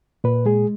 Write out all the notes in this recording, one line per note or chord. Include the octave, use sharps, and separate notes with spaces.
A#2 B4
G#3 G#4